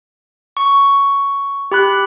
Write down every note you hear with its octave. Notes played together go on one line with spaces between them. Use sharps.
C#6
G4 B5 F#6